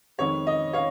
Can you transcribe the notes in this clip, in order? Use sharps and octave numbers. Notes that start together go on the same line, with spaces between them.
F2 D#3 G#3 C#5
D#5
C#5 F5